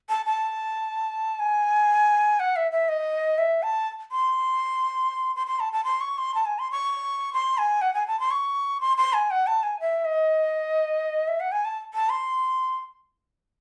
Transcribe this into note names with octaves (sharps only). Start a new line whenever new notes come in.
A5
A5
G#5
F#5
E5
E5
D#5
E5
A5
C6
C6
C6
A5
A5
C6
C#6
C6
A5
G#5
C6
C#6
C6
G#5
F#5
G#5
A5
C6
C#6
C6
C6
G#5
F#5
A5
G#5
E5
D#5
E5
F#5
G#5
A5
A5
C6